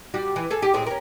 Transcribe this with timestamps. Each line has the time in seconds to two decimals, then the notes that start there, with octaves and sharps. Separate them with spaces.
0.14 G3 F#4 G4
0.36 E3
0.50 G#4 A4
0.62 G4
0.74 A2 G#3 C4
0.86 C#4 A#4